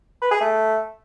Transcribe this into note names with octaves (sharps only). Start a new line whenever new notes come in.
B4
G#4
A3